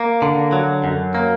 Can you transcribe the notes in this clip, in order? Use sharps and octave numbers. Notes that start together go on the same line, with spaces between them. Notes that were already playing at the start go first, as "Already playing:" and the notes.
Already playing: A#3
D3
F#3
F#2
A#3